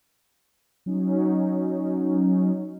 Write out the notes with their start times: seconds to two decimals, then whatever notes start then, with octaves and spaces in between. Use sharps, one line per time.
0.86 F#3 C#4 D#4